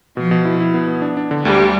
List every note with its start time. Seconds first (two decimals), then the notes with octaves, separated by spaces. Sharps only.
0.16 B2 F3
0.31 B2
0.45 E4
0.60 E4
0.74 B3
0.88 B3
1.02 D4
1.17 D4
1.31 D3
1.45 D2 G3
1.60 A3